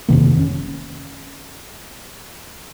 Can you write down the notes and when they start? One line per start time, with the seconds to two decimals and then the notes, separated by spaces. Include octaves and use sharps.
0.09 F1 C3 D#3 A#3
0.39 C#4